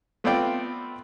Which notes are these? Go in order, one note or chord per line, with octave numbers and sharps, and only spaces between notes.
A3 B3 C4 F4 D5 G5